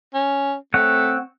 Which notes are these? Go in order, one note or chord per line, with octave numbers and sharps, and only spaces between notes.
C#4
A3 C4 C#5 F#5